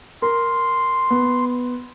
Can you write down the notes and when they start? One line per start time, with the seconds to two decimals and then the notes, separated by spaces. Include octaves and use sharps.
0.22 A#4 C6
1.10 B3